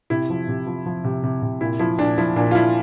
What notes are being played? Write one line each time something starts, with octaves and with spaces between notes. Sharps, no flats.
C3 E4
F3
C3
F3
F3
C3
C3
C3
A#2 E4
F3 E4
A#2 D4
F3 E4
A#2 D4
F4
F3 E4